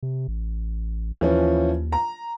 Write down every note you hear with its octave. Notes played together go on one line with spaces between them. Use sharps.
C3
A1
D#2 E3 F3 C#4
A#5